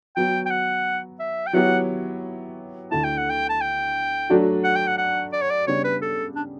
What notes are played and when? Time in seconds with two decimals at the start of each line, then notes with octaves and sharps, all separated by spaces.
0.16 F#3 B3 F#4 G5
0.46 G5
0.50 F#5
1.19 E5
1.47 G5
1.53 F#3 B3 E4 G4 C#5 F#5
2.91 D2 D3 A3 E4 A5
3.04 G5
3.17 F#5
3.30 G5
3.49 A5
3.61 G5
4.29 F#3 A3 D4 F#4
4.64 F#5
4.76 G5
4.87 F#5
4.98 F#5
5.33 D5
5.42 C#5
5.51 D5
5.67 C#3 G3 B3 D4 C#5
5.84 B4
6.02 A4
6.36 D4